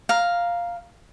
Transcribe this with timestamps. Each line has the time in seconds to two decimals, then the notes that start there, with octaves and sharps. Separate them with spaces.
0.09 F5 A#5